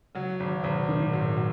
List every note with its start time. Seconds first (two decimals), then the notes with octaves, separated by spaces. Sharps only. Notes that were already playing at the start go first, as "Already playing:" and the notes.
0.15 C#3 F#3
0.40 G#1
0.64 G#1 B2
0.88 A#2 D#3
1.03 A#2
1.13 G#2 F#3
1.29 A#2
1.37 F#3